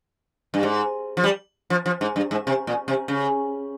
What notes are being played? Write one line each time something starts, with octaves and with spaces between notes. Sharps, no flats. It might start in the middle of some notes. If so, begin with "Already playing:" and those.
G2
G#2
F3
G3
F3
F3
G#2
G2
G#2
C3
A#2
C3
C#3